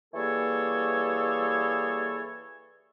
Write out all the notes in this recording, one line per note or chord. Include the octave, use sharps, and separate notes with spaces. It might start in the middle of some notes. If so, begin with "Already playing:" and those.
E3 G3 A#3 G#4 A4 C#5